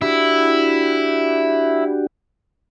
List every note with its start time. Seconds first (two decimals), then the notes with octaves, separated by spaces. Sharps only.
0.02 D4 E4 F#4 G4